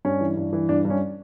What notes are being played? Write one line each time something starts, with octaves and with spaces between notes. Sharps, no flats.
G2 C#4
E3
G2
E3
G2 D4
G2
C#4